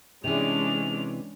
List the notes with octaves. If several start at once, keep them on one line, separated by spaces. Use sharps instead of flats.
C3 E3 G#3 C#4 D4 F7